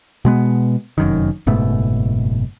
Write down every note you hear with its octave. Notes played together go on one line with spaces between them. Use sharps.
B2 G#3 B3
F1 F#2 D#3
F#1 G#2 B2 A3